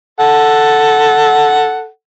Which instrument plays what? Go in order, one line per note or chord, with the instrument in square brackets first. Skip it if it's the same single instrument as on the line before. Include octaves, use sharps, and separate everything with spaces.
[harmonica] A4 F#5